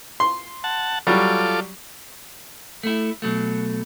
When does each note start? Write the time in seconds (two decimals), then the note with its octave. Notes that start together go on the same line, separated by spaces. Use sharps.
0.20 C6
0.64 F#5 A5
1.07 F#3 G3 F4 A4 D6
2.83 A3 E4
3.22 B2 F#3 A3